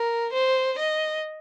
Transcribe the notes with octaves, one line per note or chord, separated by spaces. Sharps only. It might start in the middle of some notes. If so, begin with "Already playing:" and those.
Already playing: A#4
C5
D#5